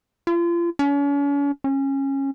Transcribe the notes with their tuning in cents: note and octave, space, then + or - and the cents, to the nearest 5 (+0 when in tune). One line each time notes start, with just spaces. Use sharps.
F4 -35
C#4 +40
C#4 -20